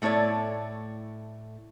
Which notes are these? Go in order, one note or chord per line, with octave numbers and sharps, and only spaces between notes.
A2 A3 E4 C#5 D5